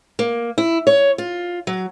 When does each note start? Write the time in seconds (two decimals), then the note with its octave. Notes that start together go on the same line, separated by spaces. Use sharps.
0.19 A#3
0.58 E4
0.87 C#5
1.18 F4
1.67 F#3